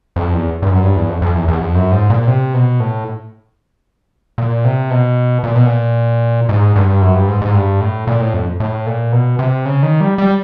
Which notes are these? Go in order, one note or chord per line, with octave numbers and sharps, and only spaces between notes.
F2
E2
G2
F#2
G2
E2
F2
F2
E2
E2
F2
F#2
G#2
A#2
C3
B2
A2
A#2
C3
B2
A#2
B2
A#2
G#2
G2
F#2
G2
G#2
G#2
G2
A2
A#2
A2
F2
A2
A#2
B2
C3
C#3
D#3
G3
G3